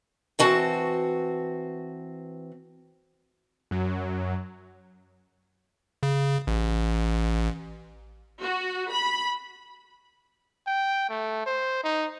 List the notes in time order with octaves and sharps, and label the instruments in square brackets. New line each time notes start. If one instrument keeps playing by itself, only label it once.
[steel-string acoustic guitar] E3 C4 F#4 A5
[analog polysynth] F#2 F#3
[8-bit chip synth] C#3
A1
[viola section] F#4
B5
[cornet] G5
A3
C5
D#4